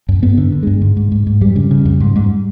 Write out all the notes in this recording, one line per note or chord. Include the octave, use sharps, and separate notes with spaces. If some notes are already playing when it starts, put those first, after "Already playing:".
F#2
G2 B3
D3
D3
G2 G#3
G#2
G#2
G#2
G#2
F2 G3
C#3
C#3
F2
G#2
G#2